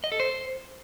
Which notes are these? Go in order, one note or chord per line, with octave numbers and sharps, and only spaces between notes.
D#5
A4
C5